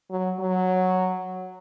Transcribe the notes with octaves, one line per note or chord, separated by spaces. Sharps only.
F#3
F#3